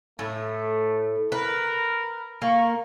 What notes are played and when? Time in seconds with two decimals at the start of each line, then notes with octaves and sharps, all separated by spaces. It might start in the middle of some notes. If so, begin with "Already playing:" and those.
0.19 A2 A3
1.32 A#4 B4
2.42 A#3 C#6